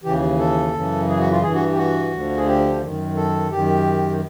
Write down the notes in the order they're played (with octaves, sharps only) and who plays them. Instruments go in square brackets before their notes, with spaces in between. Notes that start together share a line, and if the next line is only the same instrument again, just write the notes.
[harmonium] D#2 C#3 E3 G4
A4
F#2 C#3 E3
G#4
F#4
F4
G2 E3 G#4
F#4
G4
F#4
D2 D3 F3
G#4
G4
F#2 D#3
A4
F#2 D#3 G4